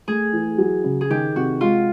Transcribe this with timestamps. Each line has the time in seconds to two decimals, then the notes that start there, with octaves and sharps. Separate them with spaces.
0.08 A3 G#4
0.33 E3
0.58 F#3
0.84 C#3
1.01 G#4
1.10 D#3 G4
1.35 C3 F#4
1.61 G#3 F4